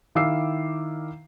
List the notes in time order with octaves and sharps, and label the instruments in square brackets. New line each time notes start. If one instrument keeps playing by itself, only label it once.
[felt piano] D#3 E4 F5 D6 E6 C7